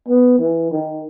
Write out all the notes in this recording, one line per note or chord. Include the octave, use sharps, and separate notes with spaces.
B3
E3
D#3